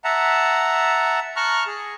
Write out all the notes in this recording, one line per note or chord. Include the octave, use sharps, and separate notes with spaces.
E5 F#5 A5 A#5
A5 A#5 C#6 F6 F#6
G#4